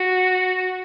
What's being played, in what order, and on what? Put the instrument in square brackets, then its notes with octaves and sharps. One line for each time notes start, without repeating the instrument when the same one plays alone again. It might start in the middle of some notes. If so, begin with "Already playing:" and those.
Already playing: [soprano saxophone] F#4